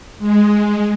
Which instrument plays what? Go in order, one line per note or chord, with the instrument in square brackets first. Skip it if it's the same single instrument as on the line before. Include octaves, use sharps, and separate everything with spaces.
[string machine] G#3